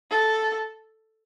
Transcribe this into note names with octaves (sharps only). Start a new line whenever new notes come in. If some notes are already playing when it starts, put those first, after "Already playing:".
A4